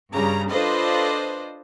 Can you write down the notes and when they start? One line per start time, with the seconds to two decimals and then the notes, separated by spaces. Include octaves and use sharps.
0.13 G2 C#3 G3 A#5
0.51 D4 F4 A4 B4 C5 D#5